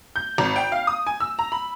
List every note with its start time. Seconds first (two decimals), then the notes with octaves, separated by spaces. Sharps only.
0.16 G6
0.38 G#1
0.56 G5
0.72 F5
0.87 D#6
1.07 G#5
1.20 E6
1.39 A#5
1.52 B5